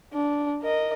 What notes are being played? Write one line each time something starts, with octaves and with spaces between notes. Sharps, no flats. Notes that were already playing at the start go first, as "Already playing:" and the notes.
D4
A#4 D#5